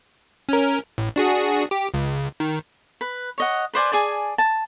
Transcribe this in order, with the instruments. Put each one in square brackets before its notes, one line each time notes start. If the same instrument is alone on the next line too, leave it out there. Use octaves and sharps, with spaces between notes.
[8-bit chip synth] C#4 A#4
A1
D4 F#4 G#4
G4
C#2
D#3
[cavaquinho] B4
C#5 D#5 F#5
B4 C5 D5 G#5
G#4 D5 G#5 A5
A5